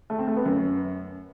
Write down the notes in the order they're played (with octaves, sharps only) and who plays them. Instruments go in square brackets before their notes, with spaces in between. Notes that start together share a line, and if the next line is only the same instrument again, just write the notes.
[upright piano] A3
C4
A3
B3
F#2